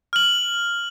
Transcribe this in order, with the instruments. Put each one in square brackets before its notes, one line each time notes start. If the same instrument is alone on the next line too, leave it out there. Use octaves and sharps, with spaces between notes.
[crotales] F6 F#7